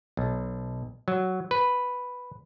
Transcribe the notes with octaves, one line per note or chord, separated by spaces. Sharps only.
B1
F#3
B4